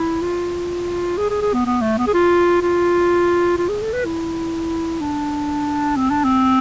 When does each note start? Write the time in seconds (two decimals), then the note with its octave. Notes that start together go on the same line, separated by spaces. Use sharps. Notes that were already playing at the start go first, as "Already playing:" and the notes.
Already playing: E4
0.22 F4
1.18 G#4
1.30 G#4
1.42 G#4
1.54 B3
1.66 B3
1.82 A3
1.98 B3
2.07 G#4
2.14 F4
2.62 F4
3.58 F4
3.69 G#4
3.82 A4
3.94 B4
4.06 E4
5.01 D4
5.97 C4
6.11 D4
6.25 C4